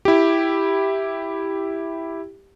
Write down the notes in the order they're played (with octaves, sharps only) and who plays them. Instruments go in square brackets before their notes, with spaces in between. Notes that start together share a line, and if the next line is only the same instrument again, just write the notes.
[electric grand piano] E4 G4